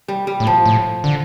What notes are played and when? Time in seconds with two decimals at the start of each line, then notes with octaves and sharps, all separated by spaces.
0.08 G3
0.27 G3
0.40 A2
0.47 F3
0.66 A2
1.04 D3